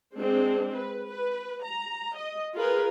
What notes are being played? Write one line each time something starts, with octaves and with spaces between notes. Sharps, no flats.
G#3 C4 D4
B4
B4
A#5
D#5
F4 G#4 A#4 B4